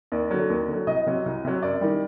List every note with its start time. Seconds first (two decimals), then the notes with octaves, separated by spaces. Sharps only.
0.12 D#2 D5
0.31 D3 F#3
0.50 D#2
0.68 D3 F#3
0.87 C2 D#5
1.07 C3 F#3
1.26 C2
1.45 C3 F#3
1.62 F#2 D5
1.81 D#3 G3